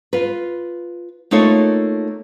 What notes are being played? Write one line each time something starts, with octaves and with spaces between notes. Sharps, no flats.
F4 B4
A3 A#3 D#4 F4 A4 C#5